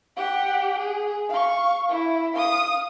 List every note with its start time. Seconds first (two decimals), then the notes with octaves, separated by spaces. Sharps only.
0.17 G4 F#5
0.78 G#4
1.29 F5 C#6
1.89 E4
2.33 F5 D#6